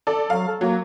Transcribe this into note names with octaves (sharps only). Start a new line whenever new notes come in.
A4 D5
F#3 F5
A4
F#3 A#3